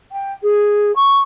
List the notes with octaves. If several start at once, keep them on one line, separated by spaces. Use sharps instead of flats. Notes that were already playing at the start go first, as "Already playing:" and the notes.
G5
G#4
C#6